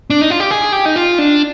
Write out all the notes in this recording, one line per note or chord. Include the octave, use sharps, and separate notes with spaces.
D4
D#4
F4
G4
G#4
G4
D#4
F4
D4